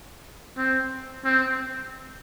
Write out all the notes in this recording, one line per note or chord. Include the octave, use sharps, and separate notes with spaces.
C4
C4